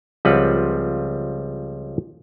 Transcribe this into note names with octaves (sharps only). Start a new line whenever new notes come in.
C#2 F3 G3 C4 B4 F#5